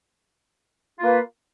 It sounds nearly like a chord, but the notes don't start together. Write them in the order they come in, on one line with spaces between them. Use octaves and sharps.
F4 A#3 B4